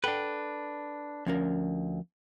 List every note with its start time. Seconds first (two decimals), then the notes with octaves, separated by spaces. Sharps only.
0.04 D4 A4 B4 F#5 G5
1.27 D2 F3 C#4 A#4